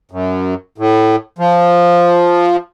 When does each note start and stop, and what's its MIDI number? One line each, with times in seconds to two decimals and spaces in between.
0.11 0.54 42
0.78 1.16 45
1.39 2.57 53